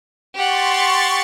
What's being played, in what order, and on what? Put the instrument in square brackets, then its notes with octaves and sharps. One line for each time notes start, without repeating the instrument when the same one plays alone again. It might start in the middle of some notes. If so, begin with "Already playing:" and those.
[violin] G4 F#5 [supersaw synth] C6 C#6 A6